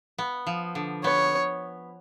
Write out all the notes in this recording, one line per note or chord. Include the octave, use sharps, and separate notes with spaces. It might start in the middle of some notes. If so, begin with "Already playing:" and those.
B3
F3
D3
B3 C#5